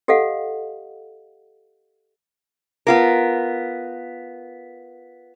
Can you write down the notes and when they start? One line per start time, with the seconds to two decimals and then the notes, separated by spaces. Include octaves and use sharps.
0.08 G4 A4 D#5 F5 F#5
2.87 B3 F4 A#4